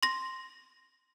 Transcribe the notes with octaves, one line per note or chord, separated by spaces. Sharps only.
C6 A#6